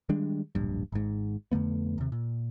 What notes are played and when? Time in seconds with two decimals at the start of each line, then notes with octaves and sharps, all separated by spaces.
0.09 D#3 G3 G#3 D4
0.55 D1 A#1 G2
0.92 G#1 G#2
1.52 F2 D3 A3 B3
1.98 D#2 C3
2.12 A#2